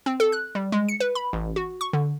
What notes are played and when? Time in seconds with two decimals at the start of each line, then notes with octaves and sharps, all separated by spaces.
0.06 C4
0.20 A4
0.32 F#6
0.55 G3
0.72 G#3
0.88 C#7
1.00 B4
1.15 B5
1.33 A1
1.56 F#4
1.81 C#6
1.93 D3